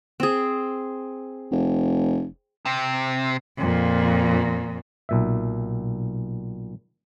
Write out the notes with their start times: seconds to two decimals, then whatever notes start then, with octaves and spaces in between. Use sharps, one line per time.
0.20 C4 G#4
1.51 F1
2.65 C3
3.58 F2 A#2
5.09 B1 A#2 E5